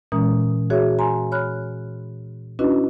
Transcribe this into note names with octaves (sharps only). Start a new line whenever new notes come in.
A#2 E3 G#3 C#4 A#5 D#6
F#4 G#4 C#5 E5
G#5 A#5 C6
C#5 B5 F6 F#6
C#4 D4 E4 F#4 B4 D#5